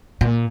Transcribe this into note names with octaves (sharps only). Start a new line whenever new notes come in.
A#2